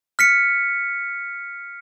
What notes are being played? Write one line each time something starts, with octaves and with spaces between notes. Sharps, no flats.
F6 B6 C#7